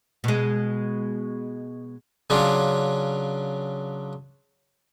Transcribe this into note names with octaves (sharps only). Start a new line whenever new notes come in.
B2 G#3
C#3 F#3 C#4 D4 F4